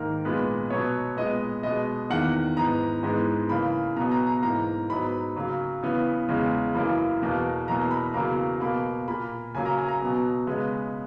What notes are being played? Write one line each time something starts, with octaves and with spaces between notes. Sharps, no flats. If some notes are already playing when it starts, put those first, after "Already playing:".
Already playing: G#2 D#3 A#3 A#4
A#2 G#3 B3 B4
B2 F#3 B3 C#5
A#2 G#3 B3 D#5
B2 G#3 B3 D#5
E2 D#3 A#3 F#5
G#2 E3 B3 A#5
G#2 E3 G#3 B3
C#3 E3 A#3 B5
B2 F#3 B3 A#5
A#5
A#5
G#2 E3 A#3 A#5
G#2 F#3 B3 B5
C#3 F#3 A#3
C#3 E3 B3
E2 C#3 G#3
F#2 C#3 E3 A#3 B5
E2 B2 A#3
E2 B2 F#3 A#3 A#5
A#5
B5
E2 C#3 F#3 A#3 A#5
B2 A#3 B5
A#2 A#3 B5
C#3 F#3 A#3 G#5
A#5
G#5
A#5
B2 F#3 B3
C#3 G#3 B3